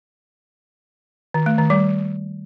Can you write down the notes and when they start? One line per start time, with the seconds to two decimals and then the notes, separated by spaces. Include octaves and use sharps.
1.34 D#3
1.46 A3
1.58 D#3
1.70 G3